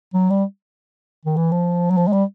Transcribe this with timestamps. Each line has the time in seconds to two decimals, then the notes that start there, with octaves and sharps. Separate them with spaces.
0.14 F#3
0.30 G3
1.25 D#3
1.36 E3
1.52 F3
1.90 F#3
1.97 F3
2.07 G#3
2.13 G3